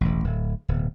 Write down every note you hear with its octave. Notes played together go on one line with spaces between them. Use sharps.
E1 A1
D1
D1 B2